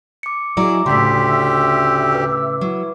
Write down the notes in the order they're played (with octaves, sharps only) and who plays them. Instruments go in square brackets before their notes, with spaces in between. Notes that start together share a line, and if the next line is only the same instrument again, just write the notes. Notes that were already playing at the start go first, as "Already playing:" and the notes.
[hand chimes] D6 C#7
[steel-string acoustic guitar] F#3 E4 D5 [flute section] G#4 D#5 [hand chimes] A#5 D6
[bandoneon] D2 G4 [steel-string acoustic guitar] A2 C#3 [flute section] D5 E6 [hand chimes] C6 B6
[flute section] E5 E6
[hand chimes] B4 D6
[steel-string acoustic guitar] F#3 [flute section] E4